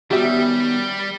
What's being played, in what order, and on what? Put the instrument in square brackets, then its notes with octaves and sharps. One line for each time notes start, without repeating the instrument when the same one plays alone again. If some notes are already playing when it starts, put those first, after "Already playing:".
[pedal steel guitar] D#3 B3 C#4 [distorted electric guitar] G3 [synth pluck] F#4 G4 E5